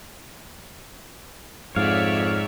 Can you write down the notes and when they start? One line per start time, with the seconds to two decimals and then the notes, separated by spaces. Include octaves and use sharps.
1.76 F2 G#2 C#5 D5 E5 F5